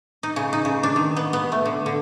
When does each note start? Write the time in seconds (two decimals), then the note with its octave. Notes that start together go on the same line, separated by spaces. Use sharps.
0.23 D#4
0.36 C#3
0.53 D#4
0.65 C#3
0.83 D4
0.96 D#3
1.16 B3
1.33 B3
1.52 A3
1.65 D3
1.86 D3